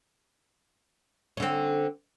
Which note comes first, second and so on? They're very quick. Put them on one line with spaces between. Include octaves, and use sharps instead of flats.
C#4 D3 C4